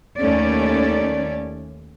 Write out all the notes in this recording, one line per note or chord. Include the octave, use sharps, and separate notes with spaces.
D#2 D#3 A3 C#4 D5